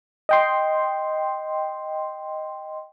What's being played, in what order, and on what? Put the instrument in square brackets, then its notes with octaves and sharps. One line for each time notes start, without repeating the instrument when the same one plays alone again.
[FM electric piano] D#5 G5 C6